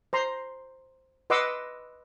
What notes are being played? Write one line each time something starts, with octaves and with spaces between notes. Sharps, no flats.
C5 A#5 C6
B4 D#5 F#5 C6 D6 E6